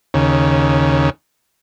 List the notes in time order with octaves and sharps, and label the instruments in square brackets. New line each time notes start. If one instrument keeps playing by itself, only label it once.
[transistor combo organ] D#2 C#3